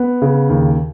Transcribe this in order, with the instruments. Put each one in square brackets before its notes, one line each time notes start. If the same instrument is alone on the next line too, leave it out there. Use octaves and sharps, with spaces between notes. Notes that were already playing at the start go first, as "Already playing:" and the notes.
Already playing: [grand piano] B3
C#3
D#2